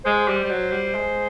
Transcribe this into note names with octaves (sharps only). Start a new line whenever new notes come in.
G#3 C5
G3
G3
F#3
G3
G#3